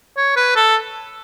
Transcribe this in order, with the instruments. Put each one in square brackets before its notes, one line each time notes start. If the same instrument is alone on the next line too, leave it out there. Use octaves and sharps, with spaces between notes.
[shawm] C#5
B4
A4